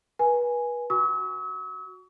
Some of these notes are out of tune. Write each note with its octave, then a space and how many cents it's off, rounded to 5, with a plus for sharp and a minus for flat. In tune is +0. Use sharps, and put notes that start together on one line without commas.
B4 -30 G#5 +0
F#4 +0 C#6 +35 E6 -45